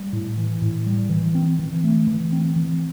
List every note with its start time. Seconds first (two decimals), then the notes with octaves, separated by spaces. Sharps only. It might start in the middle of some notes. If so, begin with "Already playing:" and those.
Already playing: G3
0.13 A2
0.38 E3
0.62 A2
0.86 G3
1.10 E3
1.35 C4
1.59 E3
1.84 A3
2.07 E3
2.32 C4
2.56 E3